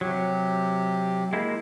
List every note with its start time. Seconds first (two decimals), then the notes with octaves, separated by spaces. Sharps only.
0.01 C3 F#3 G4
1.33 G#3 A#3 E4